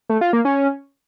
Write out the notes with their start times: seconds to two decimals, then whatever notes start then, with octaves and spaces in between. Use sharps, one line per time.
0.09 A3
0.21 F4
0.33 A#3
0.45 C#4